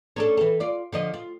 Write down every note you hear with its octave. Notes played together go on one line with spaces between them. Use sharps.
C#4 D4 A4
E3 A4
F4 D5
D3 F3 D#5
F4